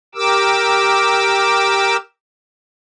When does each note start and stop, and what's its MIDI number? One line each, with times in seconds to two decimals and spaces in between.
0.15 1.97 67
0.15 1.97 70
0.15 1.97 86
0.15 1.97 88